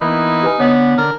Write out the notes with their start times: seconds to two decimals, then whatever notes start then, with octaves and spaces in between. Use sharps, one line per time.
0.01 E3 A#3 B3 D#4
0.43 G4 B4 G#5
0.60 D3 B3 C#5
0.98 D3 A#4